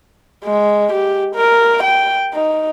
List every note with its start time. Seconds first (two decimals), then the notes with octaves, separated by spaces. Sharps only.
0.45 G#3
0.92 G4
1.36 A#4
1.83 G5
2.34 D#4